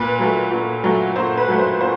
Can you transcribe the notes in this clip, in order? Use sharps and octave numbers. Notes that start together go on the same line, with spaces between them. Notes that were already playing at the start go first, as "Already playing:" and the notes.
Already playing: A#2 B4
F#3 A3
A#2
F#3 A3
A#2 C5
B4
F#3 A3
C5
A#2 C5